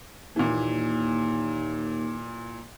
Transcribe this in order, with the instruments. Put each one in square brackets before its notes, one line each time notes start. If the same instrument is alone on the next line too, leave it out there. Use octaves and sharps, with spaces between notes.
[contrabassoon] D#2 [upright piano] A#2 E3